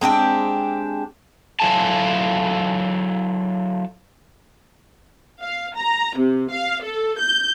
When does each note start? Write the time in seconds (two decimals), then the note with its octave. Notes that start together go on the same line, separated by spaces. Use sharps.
0.01 G#3 C4 D4 G4
1.60 F#3 E4 F4 A4 G#5 A5
5.41 F5
5.75 A#5
6.17 C3
6.51 F5
6.82 A4
7.19 G6